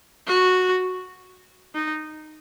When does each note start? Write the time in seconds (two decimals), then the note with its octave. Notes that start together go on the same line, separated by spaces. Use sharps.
0.27 F#4
1.75 D#4